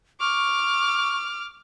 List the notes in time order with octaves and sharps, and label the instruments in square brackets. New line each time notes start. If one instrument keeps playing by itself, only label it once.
[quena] C#6 [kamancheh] D6 F6